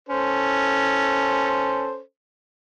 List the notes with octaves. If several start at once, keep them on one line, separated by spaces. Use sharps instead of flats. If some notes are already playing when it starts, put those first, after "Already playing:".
C#4 A4 C5